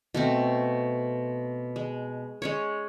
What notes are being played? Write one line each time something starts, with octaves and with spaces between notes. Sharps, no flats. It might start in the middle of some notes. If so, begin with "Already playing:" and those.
B2 A3 C4
G#3
G#3 C#4 C#5